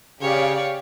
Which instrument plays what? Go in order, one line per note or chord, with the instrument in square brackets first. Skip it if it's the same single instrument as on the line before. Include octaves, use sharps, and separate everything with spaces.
[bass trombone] C#3 [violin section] G4 F5 [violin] C#5 D5